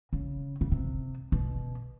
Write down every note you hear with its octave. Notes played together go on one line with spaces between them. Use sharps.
C#3
C#3
C3
B2